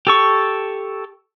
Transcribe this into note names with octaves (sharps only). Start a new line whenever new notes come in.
G4 A4 C#6